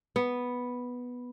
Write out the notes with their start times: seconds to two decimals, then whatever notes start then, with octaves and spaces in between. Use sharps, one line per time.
0.16 B3